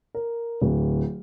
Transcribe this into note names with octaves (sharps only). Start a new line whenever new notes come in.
A#4
D1